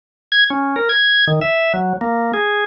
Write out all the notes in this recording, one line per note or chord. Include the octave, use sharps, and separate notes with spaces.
G#6
C#4
A#4
G#6
D#3
E5
F#3
A#3
G#4